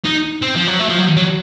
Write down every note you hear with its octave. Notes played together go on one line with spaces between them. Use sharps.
D#4
C4
F3
F#3
A3
F3
F#3
F#3